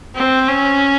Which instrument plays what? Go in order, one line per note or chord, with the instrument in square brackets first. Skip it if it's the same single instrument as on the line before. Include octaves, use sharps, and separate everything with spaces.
[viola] C4
C#4